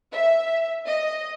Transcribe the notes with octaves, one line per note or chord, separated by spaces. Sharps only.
E5
D#5